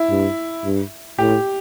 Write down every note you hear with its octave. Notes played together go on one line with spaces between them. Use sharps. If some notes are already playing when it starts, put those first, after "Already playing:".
Already playing: E4
G2
G2
A2 G4